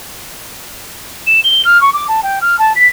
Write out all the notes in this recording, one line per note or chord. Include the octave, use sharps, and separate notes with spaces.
E7
G7
F6
C#6
D6
A5
G5
F6
A5
B6